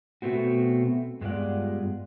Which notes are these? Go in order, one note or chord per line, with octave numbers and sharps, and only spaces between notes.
B2 A3 B3 C4 F#4
G2 G#3 B3 F4 D5 F#5